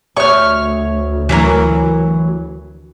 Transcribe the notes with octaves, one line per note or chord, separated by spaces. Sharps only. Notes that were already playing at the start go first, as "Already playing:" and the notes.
D2 C#5 E5 C#6 F6
E3 F#3 A#4